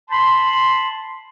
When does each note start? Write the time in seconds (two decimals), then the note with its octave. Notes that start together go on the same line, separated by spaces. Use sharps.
0.09 A5 B5 C6